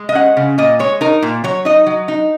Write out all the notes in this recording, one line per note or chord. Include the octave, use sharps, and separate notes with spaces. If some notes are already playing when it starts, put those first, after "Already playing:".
Already playing: G#3
D#5
C#4 F#5
C#3
A#2 D#5
G#3 C#5
D#4 A#4
A#2
F#3 C#5
D#4 D#5
F#3
D#4